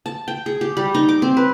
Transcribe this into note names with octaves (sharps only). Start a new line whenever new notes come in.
A5
G5
G#4
G4
G3
D#4
D6
C4
B4